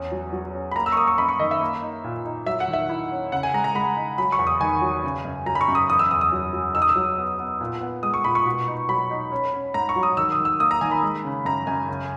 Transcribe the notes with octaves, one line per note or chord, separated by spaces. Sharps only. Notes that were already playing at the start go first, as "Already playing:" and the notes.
Already playing: E2 C#4
F#3
F#3
C#4
B5
A#3 A#5
E6
C#6
A#3 D#6
C#6
F#2 B5
C#6
D#3 D#5
E5
A#3
D#4
A#2
D#4
F#3 E5
F#5
D#3
E5
E4
C#4
C#3 F#5
G#5
G#3 A#5
A#5
G#3 B5
D#4
F#3 B5
C#6
E2
D#6
D#3 G#5
F#3
C#3
F#2
F#3 A#5
B5
C#6
F#2
D#6
E2 D#6
E6
E2 D#6
D#6
F#3
F#3
D#4 E6
D#6
E6
F#3
B3
B3
A#2
B3
G#3 D#6
C#6
A#2 B5
C#6
B2
D#4
F#3 B5
D#4
C#4
C#4
G#2 A#5
C#6
F#3
D#6
D#3 E6
D#6
D#3
E6
A#3 D#6
A#5
D#3 G#5
B5
G#3
C#3
F#2 A#5
F#2 G#5
C#3